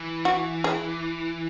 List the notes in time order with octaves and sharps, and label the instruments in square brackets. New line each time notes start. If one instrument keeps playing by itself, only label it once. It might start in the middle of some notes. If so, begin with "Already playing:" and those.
Already playing: [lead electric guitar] E3
[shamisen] F#4
G#4